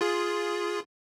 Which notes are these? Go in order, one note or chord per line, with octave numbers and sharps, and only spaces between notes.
F4 G#4